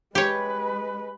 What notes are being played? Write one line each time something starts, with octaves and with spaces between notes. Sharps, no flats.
G#3 G4 B4 C#5